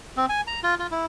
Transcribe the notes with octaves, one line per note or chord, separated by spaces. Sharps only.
C4
G#5
A#5
F4
F4
E4